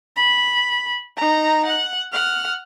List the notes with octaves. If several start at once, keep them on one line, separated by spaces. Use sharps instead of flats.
B5
D#4 A#5
F#5
F#5 F6